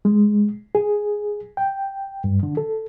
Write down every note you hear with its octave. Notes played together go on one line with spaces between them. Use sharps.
G#3
G#4
G5
G2
D3
A4